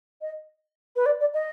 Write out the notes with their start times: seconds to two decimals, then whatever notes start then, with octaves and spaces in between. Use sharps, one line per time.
0.22 D#5
0.96 B4
1.06 D5
1.20 D5
1.34 D#5